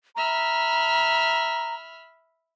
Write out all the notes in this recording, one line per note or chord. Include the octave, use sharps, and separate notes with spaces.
E5 A#5 B5 F6